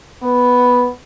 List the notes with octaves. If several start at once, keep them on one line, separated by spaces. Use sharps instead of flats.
B3